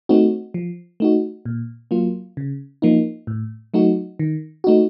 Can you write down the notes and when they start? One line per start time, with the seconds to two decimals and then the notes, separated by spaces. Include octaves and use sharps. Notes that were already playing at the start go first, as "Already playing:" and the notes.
0.09 A3 C4 D#4 F#4
0.54 F3
1.00 A3 D#4 F#4
1.45 A#2
1.91 F#3 A#3 F4
2.37 C#3
2.82 F3 A#3 D#4
3.27 A2
3.74 F#3 A3 D#4 F#4
4.19 D#3
4.64 A3 D#4 F#4